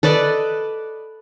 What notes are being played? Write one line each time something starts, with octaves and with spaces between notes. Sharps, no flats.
A4 B4 D5 D#5